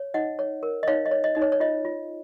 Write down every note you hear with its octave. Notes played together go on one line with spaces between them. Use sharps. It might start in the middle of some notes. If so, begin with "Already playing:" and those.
Already playing: C#5
D#4 D#5 F#5
C#5
A#4
D#5
D#4 C#5 F5
D#5
C#5
D#5
D#4 D#5
C#5
C#5
F4 D#5
F4